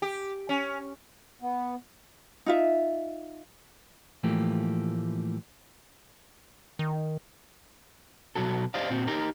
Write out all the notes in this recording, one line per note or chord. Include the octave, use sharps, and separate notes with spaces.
G4
C#4
B3
D#4 F4 E5
A2 E3 F3 A3 A#3 G4
D#3
B2 F#3 F#4 A4
G4 C5 D5 D#5 F5
A#2 C4 F#4
D#4 G4 A#4